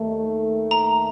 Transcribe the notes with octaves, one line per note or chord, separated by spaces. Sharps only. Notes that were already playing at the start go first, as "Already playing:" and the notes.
Already playing: D#2 D#3 A3
A#5